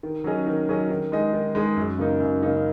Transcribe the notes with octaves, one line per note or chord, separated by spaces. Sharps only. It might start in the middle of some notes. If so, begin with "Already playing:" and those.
D#3
F#3 C#4 G#4 D#5
D#3
F#3 C#4 G#4 D#5
D#3
G#3 D#4 G#4 D#5
D#3
G#3 D#4 G#4 D#5
F#2
C#3 A#3 D#4
F#2
C#3 A#3 D#4